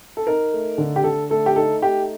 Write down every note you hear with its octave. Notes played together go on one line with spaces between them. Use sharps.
A4
D#4 A#4
A3
D3
G4
D3 A4
A3 A4
G4
D#4 A4
A3 G4